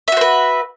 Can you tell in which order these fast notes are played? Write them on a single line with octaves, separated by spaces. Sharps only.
E5 F#4 C5 B4